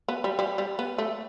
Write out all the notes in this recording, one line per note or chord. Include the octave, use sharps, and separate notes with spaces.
B3
G3
G3
G3
B3
A3